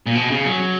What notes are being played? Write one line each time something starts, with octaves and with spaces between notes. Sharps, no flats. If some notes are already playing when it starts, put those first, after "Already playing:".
A#2
B2
C#3
F#3